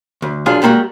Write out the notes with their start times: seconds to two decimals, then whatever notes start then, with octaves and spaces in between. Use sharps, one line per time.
0.22 D2
0.46 F#2 D4 F4 G#4 F5
0.62 G3 G#3 A#3 F4 F#4